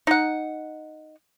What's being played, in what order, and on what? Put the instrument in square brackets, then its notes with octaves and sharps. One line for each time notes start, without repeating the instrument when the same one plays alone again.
[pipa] D#4 F#5